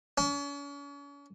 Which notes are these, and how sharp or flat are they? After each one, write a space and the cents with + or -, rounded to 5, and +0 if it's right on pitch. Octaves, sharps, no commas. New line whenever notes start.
C#4 +40